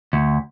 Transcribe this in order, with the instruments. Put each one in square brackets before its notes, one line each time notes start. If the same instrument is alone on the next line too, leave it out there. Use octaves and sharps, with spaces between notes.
[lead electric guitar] D2